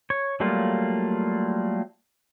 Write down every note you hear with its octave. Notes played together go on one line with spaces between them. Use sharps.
C#5
F#3 G3 A3 A#3 F4